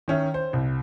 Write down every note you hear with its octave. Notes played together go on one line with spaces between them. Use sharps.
D#3 C#4 E5
C5
C2